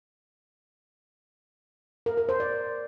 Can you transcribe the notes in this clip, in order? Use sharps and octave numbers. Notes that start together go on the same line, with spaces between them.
A#4
A#4
C5
D5